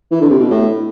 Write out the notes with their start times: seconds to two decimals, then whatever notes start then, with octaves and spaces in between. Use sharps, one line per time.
0.12 E3
0.21 D3
0.31 C3
0.40 B2
0.50 A2